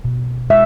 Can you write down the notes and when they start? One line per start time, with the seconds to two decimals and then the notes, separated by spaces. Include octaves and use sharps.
0.05 B2
0.50 G#3 E5